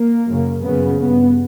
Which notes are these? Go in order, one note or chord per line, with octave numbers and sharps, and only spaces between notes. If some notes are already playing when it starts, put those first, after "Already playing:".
Already playing: A#3
F#2 C#3
F#2 C#3 B3
G2 B3